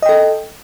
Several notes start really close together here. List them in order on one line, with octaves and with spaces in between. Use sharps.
D#5 G5 A4